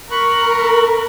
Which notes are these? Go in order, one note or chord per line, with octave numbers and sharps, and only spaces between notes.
A#4 B5 C#6 F#6